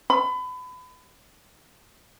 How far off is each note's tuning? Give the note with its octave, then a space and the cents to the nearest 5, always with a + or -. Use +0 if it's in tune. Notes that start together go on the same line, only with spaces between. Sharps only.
B5 +30